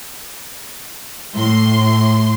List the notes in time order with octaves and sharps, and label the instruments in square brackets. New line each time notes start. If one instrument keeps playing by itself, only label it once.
[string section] A2 C6